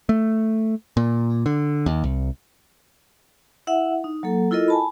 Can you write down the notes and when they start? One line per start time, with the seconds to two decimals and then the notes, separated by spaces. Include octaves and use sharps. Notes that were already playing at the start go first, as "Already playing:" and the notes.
0.09 A3
0.97 A#2
1.46 D3
1.86 D#2
2.04 C2
3.67 E4 E5 F#5
4.04 D#4
4.23 F#3 A#3 A4
4.51 E4 F4 A4 A#4 D#5
4.68 G#5 A5 B5